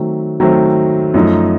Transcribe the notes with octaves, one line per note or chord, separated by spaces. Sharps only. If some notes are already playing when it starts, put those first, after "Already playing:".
Already playing: D#3 F#3 A3 C4
D#3 F#3 A3 C4
F#2 F3 A3 D#4